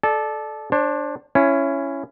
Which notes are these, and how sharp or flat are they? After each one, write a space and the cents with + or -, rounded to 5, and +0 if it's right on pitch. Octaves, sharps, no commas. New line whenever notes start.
A4 -20 D5 +20
D4 +0 C5 +40
C#4 +0 E4 +25